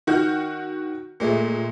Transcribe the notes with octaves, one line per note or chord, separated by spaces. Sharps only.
D#3 F#4 F#5 F6 G6
A#2 G#3 A3